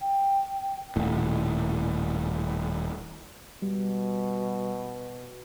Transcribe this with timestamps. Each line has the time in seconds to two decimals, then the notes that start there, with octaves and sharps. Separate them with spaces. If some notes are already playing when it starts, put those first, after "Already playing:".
0.01 G5
0.96 D#1 A2
3.62 B2 G3